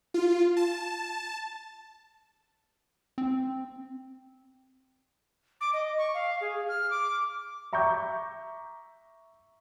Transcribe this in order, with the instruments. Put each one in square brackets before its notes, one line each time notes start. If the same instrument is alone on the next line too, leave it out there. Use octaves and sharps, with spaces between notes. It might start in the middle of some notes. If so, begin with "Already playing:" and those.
[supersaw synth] F4
A5
[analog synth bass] C4
[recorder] D6
D#5
C#6
F5
G#4
F6
D6
[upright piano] E5 A#5 C#6 D6 G6